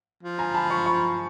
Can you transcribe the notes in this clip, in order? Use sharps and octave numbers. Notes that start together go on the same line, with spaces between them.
F3
G#5 A#5
A5 B5
B5 C#6
B5 C#6